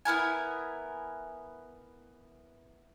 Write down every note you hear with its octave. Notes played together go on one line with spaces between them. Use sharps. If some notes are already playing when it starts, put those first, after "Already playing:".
B3 E4 A#4 G#5